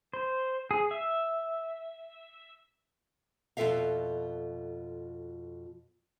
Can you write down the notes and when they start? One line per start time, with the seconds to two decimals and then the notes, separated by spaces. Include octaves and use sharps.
0.13 C5
0.71 G#4
0.91 E5
3.57 F2 B2 F4 A4 E5 F5